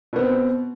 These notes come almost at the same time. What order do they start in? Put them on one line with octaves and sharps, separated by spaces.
B2 B3 C4